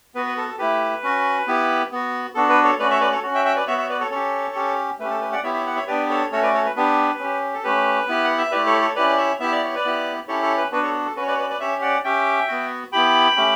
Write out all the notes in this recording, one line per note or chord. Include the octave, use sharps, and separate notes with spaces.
B3 F#4 B4
B4
A4
A4
A3 E4 G4 B4
C#4 F#4
B3 E4 G4
B3 F#4
B3 D4 F#4 A4
B4
A4 C#5
A3 C#4 F#4 B4 D5
C#5 E5
B4 D5
A4 C#5
C#4 F#4
E5 G5
E5 G5
B4 D5
B3 F#4 C#5 E5
C#5 E5
B4 D5
A4 C#5
C#4 G4 A4 C#5
C#4 G4
A3 C#4 G4 B4
A4
B4
D5 F#5
B3 E4 G4 C#5 E5
C#5 E5
F#5
C#5 E5
B3 D4 G4 B4 D5
A4 C#5
A3 C#4 F#4 A4 C#5
B4 D5
A4 C#5
B4
B3 D4 G4 B4
C#4 G4
A4
A3 C#4 G4 B4
B3 E4 G4
F#5
E5
A3 E4 G4 B4 D5
A4 C#5
A4 C#5
C#4 E4 G4 B4 D5
D5
C#5 E5
B3 E4 G4 E5
D5
C#5
B4 D5
B3 E4 G4
C#4 E4 G4 A4 C#5
A4 C#5
B4
B3 D4 F#4 B4
A4 C#5
A4
C#4 F#4 B4
C#5
B4 D5
C#5
B4 D5
B4 D5
C#4 G4 C#5 E5
D5 F#5
C#4 G4 E5 G5
B3 F#4
B3 E4 G4 G5 B5
A3 C#4 G4